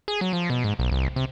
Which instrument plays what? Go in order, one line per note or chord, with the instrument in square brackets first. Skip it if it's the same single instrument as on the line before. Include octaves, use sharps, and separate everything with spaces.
[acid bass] G#4
F#3
F3
B2
G#2
B1
C2
C3